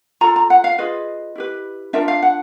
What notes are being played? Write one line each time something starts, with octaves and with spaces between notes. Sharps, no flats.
F4 A4 A#5
A#5
F#5
F5
F4 G#4 B4 D#5
E4 G4 B4
D4 F4 A#4 E5
F5
F#5